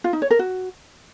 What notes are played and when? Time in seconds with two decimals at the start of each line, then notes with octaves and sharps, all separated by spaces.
0.04 F4
0.13 D#4
0.22 C#5
0.31 A#4
0.39 F#4